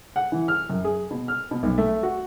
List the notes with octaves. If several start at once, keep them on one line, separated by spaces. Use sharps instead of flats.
F#5
E3
F6
F#2
G#4
B2
F6
B2
B1
A3
F#4